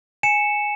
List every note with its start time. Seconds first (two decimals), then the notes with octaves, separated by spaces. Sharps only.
0.23 G#5 C#7 E7